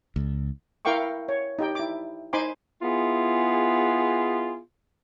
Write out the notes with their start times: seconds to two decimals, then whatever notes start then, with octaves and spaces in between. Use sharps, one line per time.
0.16 C#2
0.85 E4 A#4 F5 G5 C#6 D6
1.29 C#5
1.59 D#4 G4 G5
1.75 E4 D6
2.33 D#4 C5 G#5 B5 C6 D6
2.81 B3 E4 F4 G#4